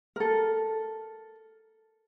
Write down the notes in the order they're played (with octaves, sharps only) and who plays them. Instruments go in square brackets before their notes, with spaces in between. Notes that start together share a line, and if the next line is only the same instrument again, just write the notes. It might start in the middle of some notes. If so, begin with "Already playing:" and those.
[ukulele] A4 A#4